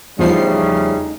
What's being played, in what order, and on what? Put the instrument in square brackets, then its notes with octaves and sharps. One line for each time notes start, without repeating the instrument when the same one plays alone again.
[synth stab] E2 F3 C7 [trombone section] C#3 G3 A3 [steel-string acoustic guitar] D#4